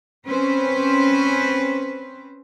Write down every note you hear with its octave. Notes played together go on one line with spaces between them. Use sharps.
C4 C#4 B4 C5